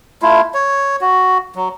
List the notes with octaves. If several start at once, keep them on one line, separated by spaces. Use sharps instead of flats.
A3 E4 F4
C#5
F#4
F#3